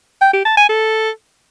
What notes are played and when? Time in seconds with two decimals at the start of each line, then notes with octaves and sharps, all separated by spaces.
0.21 G5
0.33 G4
0.45 A5
0.57 G#5
0.69 A4